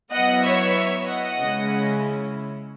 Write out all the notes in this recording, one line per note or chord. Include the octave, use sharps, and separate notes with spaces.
F#3 B3 E4 D#5 F#5
C#5 E5
D#5 F#5
C#3 G#3 C#4 E4